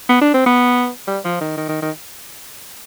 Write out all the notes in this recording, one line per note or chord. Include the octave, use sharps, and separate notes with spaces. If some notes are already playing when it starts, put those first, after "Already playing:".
B3
D4
C4
B3
G3
F3
D#3
D#3
D#3
D#3